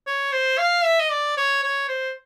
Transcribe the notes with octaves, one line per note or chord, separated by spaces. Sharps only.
C#5
C5
F5
E5
D#5
D5
C#5
C#5
C5